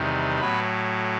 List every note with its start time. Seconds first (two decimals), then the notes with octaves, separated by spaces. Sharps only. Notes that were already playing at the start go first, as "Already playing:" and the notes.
Already playing: E2 C3 D#3 G3
0.40 A2 F#3 B3 B4